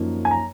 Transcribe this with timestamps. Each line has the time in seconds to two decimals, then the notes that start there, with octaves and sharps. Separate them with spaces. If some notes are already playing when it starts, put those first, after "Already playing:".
Already playing: F#2 F3 A#3 D#4
0.25 G#5
0.31 A#5